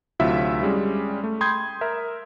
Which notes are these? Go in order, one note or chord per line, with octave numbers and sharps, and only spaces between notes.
D2 C3 F#3 E4 F4 E5
G3 G#3 C#4
A3
G5 B5 C6 D#6 G6 G#6
A#4 E5